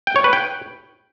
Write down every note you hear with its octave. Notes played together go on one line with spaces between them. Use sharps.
G5
C#5
B4
G5